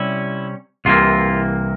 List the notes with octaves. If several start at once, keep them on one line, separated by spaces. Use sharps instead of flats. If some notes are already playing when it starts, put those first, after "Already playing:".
Already playing: C3 G3 C#4 E4
C2 C3 E3 A#3 F4